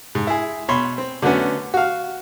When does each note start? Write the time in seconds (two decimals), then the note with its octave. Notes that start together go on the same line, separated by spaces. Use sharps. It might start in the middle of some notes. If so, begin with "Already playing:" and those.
0.15 G#2
0.27 E4 G#4
0.69 B2 C#5 B5 C6
0.98 C4
1.22 D3 F#3 A3 B3 C#4
1.74 F#4 F5